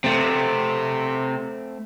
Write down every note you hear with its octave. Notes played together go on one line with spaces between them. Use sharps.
C3 A3 C4